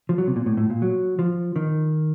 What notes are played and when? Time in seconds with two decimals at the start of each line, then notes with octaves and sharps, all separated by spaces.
0.09 F3
0.18 F#3
0.27 C3
0.36 A#2
0.46 A2
0.57 A2
0.70 A#2
0.82 F#3
1.19 F3
1.56 D#3